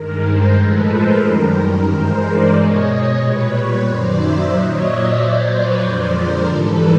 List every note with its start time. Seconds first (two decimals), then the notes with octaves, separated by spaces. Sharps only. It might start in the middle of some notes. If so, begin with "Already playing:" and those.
Already playing: G2 D#3 G#3 A#4
0.21 A#4 C5
0.54 A2 F3 G#3 A4 B4
0.87 A#4 C5
1.20 F#2 D#3 G3 A#4
1.86 G2 E3 G#3 A#4 C5
2.18 C5 D5
2.52 B2 G#3 C#5 D#5
2.84 C#5 D#5
3.17 A#2 G3 B4 C#5
3.83 F#2 D#3 F#3 C5 D5
4.16 D5 E5
4.49 A#2 F#3 C#5 D#5
4.82 D5 E5
5.15 A#2 F#3 C5 D5
5.48 B4 C#5
5.81 F2 D3 F3 G#3 C5 D5
6.13 A#4 C5
6.46 G#2 E3 G3 A4 B4